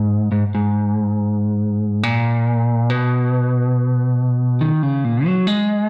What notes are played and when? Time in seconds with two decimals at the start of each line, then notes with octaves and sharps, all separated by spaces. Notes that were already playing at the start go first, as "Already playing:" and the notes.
Already playing: G#2
0.32 G#2
0.55 G#2
2.03 A#2
2.90 B2
4.61 D#3
4.83 C#3
5.04 A#2
5.26 F#3
5.47 G#3